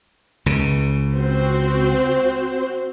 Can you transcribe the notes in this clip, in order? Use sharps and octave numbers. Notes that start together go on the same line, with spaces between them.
C#2 C#3
C4 F#4 C5